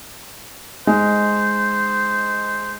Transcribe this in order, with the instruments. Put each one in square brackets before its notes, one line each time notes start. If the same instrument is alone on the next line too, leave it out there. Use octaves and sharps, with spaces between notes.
[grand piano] G#3 D#4 [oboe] C5